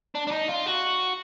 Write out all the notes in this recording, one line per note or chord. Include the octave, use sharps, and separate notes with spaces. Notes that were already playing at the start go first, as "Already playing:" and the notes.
D4
D4
D#4
F4
F#4